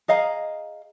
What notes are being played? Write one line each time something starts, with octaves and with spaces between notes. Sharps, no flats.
G#4 D#5 F5 A#5